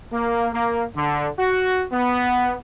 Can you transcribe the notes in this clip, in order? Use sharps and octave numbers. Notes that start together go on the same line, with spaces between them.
A#3
A#3
D3
F#4
B3